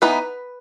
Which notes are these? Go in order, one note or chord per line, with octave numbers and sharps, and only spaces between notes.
E3 B3 D#4 B4